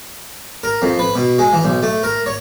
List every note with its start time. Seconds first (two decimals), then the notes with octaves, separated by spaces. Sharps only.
0.63 A#4
0.82 F2
0.99 B4
1.15 B2
1.38 G#3
1.53 E3
1.64 B1
1.82 A3
2.03 A#4
2.26 C#5